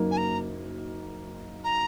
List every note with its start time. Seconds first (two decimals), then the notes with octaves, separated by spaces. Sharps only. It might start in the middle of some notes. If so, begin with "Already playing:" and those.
Already playing: F#1 F#2 F#3 A#3 D#4
0.11 G#5
0.17 A#5
1.64 A#5